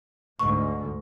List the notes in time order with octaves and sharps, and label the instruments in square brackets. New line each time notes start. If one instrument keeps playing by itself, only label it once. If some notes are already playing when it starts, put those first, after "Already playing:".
[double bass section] D2 G#2 [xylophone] C#6